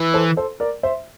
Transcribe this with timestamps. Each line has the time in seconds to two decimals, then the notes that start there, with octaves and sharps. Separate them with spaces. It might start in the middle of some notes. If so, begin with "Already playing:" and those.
Already playing: E3
0.14 A4 C5
0.37 A4 C5
0.60 A#4 D5
0.83 C5 E5